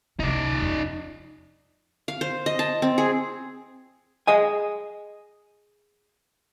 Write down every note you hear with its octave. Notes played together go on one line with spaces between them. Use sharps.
C2 C#4 D#4 D5
F2
F5
C5
D#5
A5
C4
G#4
G#4 D#5 G#5